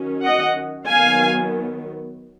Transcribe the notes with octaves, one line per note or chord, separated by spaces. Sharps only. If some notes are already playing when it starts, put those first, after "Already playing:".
Already playing: D#3 F#3 C#4
D#5 F#5
D#3 F#3 B3 F5 G#5